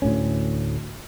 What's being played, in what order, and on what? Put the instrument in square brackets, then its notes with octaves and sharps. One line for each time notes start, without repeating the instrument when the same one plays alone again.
[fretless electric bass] D2 A2 A3 C#4